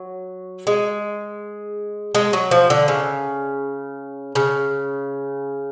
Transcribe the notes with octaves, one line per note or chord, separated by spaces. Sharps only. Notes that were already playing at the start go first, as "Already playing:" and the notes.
Already playing: F#3
G#3
G#3
F#3
F3
D3
C#3
C#3